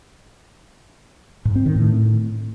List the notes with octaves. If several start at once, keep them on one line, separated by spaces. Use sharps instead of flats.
G#2
C4
D#3
A2